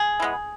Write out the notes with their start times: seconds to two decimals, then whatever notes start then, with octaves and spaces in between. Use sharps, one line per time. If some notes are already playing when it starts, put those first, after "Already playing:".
Already playing: G#4
0.20 E3 G#3 B3